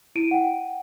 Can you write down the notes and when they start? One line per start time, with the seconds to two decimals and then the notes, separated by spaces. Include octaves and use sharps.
0.15 E4 D7 D#7
0.31 F#5 G5